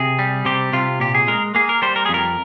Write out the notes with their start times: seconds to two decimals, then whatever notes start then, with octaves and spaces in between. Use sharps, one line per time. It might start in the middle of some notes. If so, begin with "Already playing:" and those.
Already playing: C3 G#4
0.19 G3
0.45 C3 G4
0.73 C3 F4
1.00 A#2 G4
1.15 G#4
1.28 G#3 A#4
1.55 A#3 G#4
1.69 A#4
1.82 G3 C5
1.96 A#4
2.05 G#4
2.09 F2 A#4